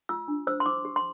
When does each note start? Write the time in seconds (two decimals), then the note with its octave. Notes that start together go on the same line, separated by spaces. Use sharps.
0.09 F4 E6
0.28 D4
0.47 C5 E6
0.60 C6
0.66 E4 D6
0.85 G4
0.96 C6